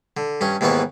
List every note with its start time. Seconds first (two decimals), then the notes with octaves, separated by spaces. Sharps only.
0.17 D3
0.41 G2 C#4 C#6
0.61 D#2 G#2 E3 B3 B4 C#6